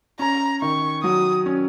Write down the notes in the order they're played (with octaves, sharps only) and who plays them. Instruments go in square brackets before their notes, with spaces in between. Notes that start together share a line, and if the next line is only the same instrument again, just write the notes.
[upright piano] C#4 [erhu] A#5
[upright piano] D#3 [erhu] C#6
[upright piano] F#3 [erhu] D#6
[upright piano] C#4